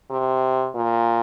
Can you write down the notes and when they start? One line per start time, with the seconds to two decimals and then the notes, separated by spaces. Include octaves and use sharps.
0.10 C3
0.75 A#2